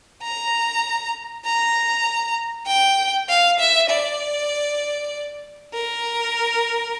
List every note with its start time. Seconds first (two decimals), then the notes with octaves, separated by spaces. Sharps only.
0.23 A#5
1.45 A#5
2.67 G5
3.29 F5
3.59 E5
3.90 D5
5.74 A#4